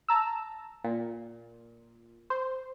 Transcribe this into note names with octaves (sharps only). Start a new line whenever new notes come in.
A5 A#5 E6
A#2
C5